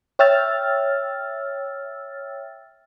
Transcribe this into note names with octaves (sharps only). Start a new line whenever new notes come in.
C#5 E5 G5 E6 F6 A6